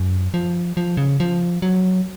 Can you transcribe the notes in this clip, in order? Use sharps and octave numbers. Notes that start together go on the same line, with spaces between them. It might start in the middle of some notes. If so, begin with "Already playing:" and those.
Already playing: F#2
F3
F3
C#3
F3
F#3